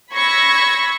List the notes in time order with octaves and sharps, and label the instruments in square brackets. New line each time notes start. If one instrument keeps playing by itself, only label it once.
[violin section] B5 C#6 E6 G#6 A#6